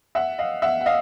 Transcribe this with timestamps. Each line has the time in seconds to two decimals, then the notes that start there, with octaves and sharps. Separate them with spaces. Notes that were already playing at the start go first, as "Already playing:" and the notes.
0.15 E5 F#5
0.38 D#5 F5
0.62 E5 F#5
0.81 F#5
0.86 D#5 F5